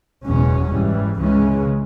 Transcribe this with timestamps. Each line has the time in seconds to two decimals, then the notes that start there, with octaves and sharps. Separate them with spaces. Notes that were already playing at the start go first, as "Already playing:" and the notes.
0.25 F#1 E2 B2 G#3 C#4
0.71 G#2 E3 G3
1.17 C#2 C#3 E3 G#3 C#4